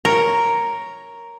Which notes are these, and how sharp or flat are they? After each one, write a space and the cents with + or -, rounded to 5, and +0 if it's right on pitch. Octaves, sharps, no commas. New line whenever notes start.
A#4 +0 C#5 +0 A#5 +0